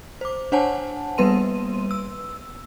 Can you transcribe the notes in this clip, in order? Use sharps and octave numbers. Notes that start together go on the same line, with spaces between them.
C5 D6
D4 C5 C#5 F#5 G#5 A5
G3 A#3 B3 B4 C6 D#7
E6